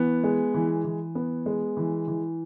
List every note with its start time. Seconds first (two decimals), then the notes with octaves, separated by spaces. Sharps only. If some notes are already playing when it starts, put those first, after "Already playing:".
Already playing: E3 B3
0.24 G#3
0.54 E3
0.85 E3
1.15 B3
1.46 G#3
1.77 E3
2.08 E3